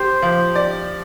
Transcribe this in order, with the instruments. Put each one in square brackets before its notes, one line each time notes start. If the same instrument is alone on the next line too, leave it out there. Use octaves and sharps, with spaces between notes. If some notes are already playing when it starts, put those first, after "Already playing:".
Already playing: [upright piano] G4 [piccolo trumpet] C5
[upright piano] F3
D5